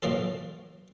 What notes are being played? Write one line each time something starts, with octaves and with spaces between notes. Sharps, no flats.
A2 E3 F#3 A#3 F4 A4